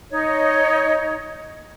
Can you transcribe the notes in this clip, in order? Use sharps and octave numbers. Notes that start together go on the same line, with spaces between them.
D#4 C#5 D#5